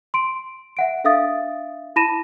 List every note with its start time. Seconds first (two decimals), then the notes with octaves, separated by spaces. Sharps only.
0.14 C6 D7
0.77 E5 F#5 D7
1.04 D4 A4 E5 F5 D#6 A6
1.96 E4 A5 B5 A#6 D#7 E7